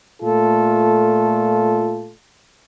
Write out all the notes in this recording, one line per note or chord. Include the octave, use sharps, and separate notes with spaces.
A#2 A3 F4 A4